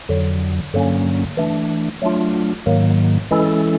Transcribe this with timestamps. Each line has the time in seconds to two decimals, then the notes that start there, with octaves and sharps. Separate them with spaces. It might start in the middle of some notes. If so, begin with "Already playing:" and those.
0.09 F2 D3 F#3
0.74 G2 D3 F#3 A#3 C#4
1.37 E3 A3 D4
2.02 F#3 A3 D4 F4
2.66 G#2 D#3 F#3 A#3
3.31 E3 G#3 C#4 E4 A4